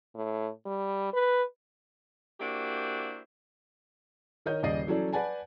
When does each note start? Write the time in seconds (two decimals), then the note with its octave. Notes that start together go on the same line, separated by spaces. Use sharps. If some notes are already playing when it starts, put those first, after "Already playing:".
0.15 A2
0.66 G3
1.13 B4
2.40 A#3 D4 E4 F#4 G4 C5
4.46 D#3 A#4 C#5 D#5 G6
4.63 D#1 C#3 D5 D#5 C7
4.87 E3 F#3 C#4 A4 D5
5.13 B4 D5 F#5 G#5 A5